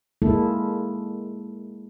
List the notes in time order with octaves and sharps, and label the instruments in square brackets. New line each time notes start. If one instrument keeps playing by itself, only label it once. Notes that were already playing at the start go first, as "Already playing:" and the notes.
[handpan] G#3 A#3 E4 A4